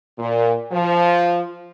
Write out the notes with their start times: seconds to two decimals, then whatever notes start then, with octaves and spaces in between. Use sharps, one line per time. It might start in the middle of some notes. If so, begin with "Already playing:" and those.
0.19 A#2
0.72 F3